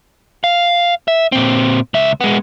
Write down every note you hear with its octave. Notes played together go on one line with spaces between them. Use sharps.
F5
E5
A#2 C4
C#2 E5
G#3 B3